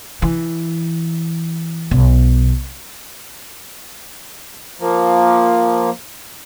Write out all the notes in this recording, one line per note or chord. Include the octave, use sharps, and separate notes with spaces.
E3
B1
F3 A#3